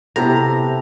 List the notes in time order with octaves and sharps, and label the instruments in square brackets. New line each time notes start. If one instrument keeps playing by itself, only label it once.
[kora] C3 [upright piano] B3 E4 G4 [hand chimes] A4 C5 A5 [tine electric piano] A#5